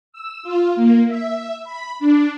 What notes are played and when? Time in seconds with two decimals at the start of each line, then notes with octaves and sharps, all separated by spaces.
0.12 E6
0.43 F4
0.76 A#3
1.08 E5
1.64 B5
1.99 D4